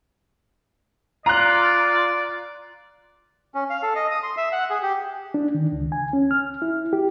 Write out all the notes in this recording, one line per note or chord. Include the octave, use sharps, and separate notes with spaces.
F4 D5 A#5 F#6
C#4
F5
A4
D#5
D#6
C6
E5
F#5
G#4
G4
D4
D#3
C#2
G#5
C#4
F6
E4
G4